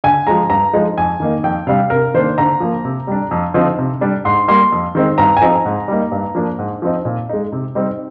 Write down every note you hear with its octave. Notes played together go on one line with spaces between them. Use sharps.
D3 G#5
F3 G#3 A#5
G2 A#5
F3 G#3 D#4
F2 G#5
D#3 A#3 D#4
F2 G5
C3 G3 D4 F5
C3 A#4
D#3 A#3 D4 C5
D3 A#5
F3 A#3
C3
G3 D4
F2
D3 F3 C4 D#4
C3
G3 D4
G#2 C6
G3 A#3 C6
F2
D#3 G#3 C4 D#4
G2 A#5
G#5
F3 C4 D#4 A#5
G#2
G3 A#3 D#4
G2
F3 A#3 D4
G#2
F3 C4 D#4
A#2
G#3 D#4
C3
G3 C4 D#4